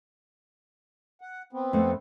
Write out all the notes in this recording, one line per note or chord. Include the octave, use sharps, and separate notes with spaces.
F#5
B3 C4
F2 A3